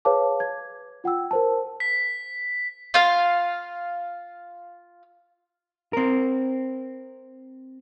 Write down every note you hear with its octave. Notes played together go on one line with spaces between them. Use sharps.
G#4 B4 C#5 F5 A5 D6
G#6
F4 F#5 G5 E6
A#4 C5 A5
B6
F4 F5
C4 A#4